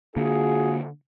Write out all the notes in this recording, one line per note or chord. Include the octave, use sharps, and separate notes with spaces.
D3 A#3 F4 F#4 G#4